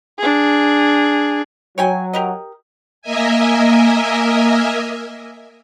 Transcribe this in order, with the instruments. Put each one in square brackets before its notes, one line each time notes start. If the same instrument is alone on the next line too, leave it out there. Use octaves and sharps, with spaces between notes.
[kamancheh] D4 G#4
[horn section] F#3 [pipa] C#5 G5 G#5
[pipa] G4 A#4 D#5
[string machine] A#3 A#4 D#5 E5 G#5